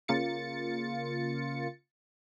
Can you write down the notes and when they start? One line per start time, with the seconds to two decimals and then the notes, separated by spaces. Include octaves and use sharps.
0.08 C#3 A#3 F4 A6 C#7